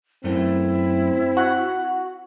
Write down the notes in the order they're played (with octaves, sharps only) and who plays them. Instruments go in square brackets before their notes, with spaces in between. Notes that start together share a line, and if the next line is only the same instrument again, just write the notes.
[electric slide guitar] F#2 A3 [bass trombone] C4 [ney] E4
[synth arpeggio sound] F#4 [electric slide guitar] F#5